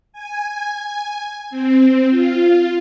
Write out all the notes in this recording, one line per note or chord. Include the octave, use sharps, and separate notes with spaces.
G#5
C4
F4